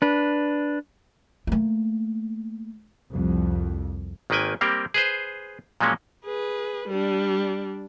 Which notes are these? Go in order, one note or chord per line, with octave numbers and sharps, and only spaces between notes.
D4 B4
A3 A#3
C2 F2
G#1 D#3 A#3 B4 G5 G#5
G3 A#3 C4 G4 A#4
G#4 B4 C5
A#2 F3 F#3 G#3 A#3 C#4
G#4 B4
G3 D4